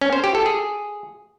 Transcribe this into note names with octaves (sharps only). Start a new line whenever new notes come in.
C#4
C5
G4
A4
G#4